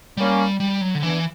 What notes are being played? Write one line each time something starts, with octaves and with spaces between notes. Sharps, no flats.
G3 A#3 C#4
G3
F#3
D3
E3 B3 D4